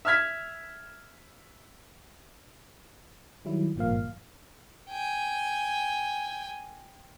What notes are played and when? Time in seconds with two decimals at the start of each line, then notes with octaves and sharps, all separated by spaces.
0.05 E5 E6 F6 G#6 B6
3.45 D#3 F#3 G3 E4
3.76 G#1 G2 A#2 F3 A#3 F5
4.90 G5 G#5